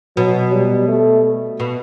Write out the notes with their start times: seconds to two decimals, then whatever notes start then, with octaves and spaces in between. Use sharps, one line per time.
0.17 B2 F#3
0.52 G3
0.88 A3
1.60 B2